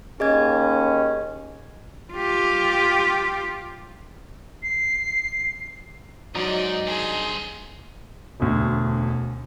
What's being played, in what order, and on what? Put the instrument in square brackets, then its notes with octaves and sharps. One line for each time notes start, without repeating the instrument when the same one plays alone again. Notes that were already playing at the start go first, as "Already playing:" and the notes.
[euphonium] D#2 [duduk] C#4 [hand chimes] G#4 D#5 G#6
[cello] F4 G4
[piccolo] C7
[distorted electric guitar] G#2 [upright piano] F#3 [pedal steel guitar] D#4 A#5 D#6 [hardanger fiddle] D5
[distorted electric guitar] G2 C5 [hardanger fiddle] G#4
[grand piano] E1 D2